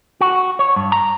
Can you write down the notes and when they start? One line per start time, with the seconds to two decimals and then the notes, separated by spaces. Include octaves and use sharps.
0.21 F#4
0.59 C#5
0.76 G2
0.92 A#5